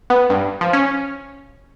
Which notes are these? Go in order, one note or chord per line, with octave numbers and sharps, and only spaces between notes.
B3
G2
F3
C#4